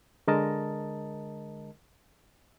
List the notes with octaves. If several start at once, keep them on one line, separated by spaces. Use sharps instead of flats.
D3 G#3 A#4 D#5 A5